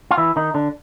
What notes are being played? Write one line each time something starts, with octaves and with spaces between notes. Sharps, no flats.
F4
E3 E4
D#3 D#4
D3 D4